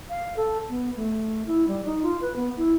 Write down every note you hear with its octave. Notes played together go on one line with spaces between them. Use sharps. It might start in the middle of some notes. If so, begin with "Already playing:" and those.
F5
A4
B3
A3
E4
G3
D#4
F4
B4
B3
E4